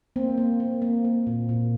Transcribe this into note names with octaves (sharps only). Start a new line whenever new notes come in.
A#3 C4
A#3
A#3
A#3
A#3
A#2
A#2